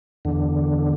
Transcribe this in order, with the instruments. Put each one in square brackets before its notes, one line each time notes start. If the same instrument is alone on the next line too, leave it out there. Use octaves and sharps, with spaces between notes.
[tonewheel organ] E2 D3